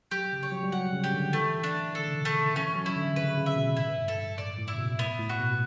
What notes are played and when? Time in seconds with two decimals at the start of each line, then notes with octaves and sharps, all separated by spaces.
0.11 F#3 G4
0.33 C#3
0.43 C#5
0.52 F#3
0.63 G3
0.72 F#3 F#5
0.93 C#3
1.04 G4
1.14 D3
1.33 E3 A3
1.64 D4
1.90 E3
1.95 D3 A4
2.07 C#3
2.14 B2
2.25 A3
2.35 C#3
2.56 E3 C#4
2.75 F#3
2.86 E4
2.96 D3
3.16 C#3 B4
3.37 C#3
3.46 E5
3.56 B2
3.77 A2 E4
3.97 G2
4.08 A4
4.17 G2
4.38 A2 D5
4.58 A2
4.68 E4
4.73 C#3
4.78 B2
4.99 A2 B3
5.19 A2
5.29 F#4
5.40 B2